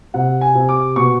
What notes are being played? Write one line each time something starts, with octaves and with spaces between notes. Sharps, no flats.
C3 F#5
G#5
C3
D6
B2 C#6